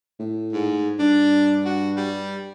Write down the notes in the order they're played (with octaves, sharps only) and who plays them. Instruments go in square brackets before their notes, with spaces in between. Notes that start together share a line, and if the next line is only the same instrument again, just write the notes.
[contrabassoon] A2
[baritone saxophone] G#2
[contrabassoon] G2 [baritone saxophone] D4
[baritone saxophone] F#4
G3